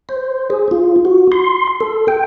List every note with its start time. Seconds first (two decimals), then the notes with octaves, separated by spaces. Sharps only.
0.09 C5
0.50 G#4
0.71 F4
1.05 F#4
1.32 C6
1.81 A4
2.08 G5